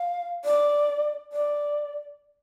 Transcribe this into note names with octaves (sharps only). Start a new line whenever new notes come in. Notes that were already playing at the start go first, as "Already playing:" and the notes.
Already playing: F5
D5
D5